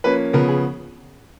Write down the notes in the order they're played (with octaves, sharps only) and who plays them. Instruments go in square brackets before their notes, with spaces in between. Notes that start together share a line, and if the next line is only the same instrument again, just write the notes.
[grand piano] F3 A#3 C#4 B4
C#3 F3 B3 A#4
G#4